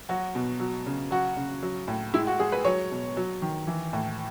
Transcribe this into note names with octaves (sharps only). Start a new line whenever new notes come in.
F#3 F#4
B2
F#3
C#3
F#3 F#4
C#3
F#3
A2
G#3 E4
F#4
G#3 G#4
B4
F#3 C#5
B2
F#3
D#3
E3
A2